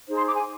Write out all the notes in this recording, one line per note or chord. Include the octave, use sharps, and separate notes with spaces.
D#4 G#4 C5
C6
D6
G#5